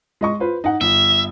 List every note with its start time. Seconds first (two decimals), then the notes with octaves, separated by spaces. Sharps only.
0.21 G#3 D#5 C#6
0.40 F4 B4 C5
0.64 D#4 F#5
0.81 G1 E5